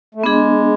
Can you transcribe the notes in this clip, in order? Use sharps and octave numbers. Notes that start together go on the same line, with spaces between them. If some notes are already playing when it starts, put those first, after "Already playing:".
A3
G#3 B3 D4 G#4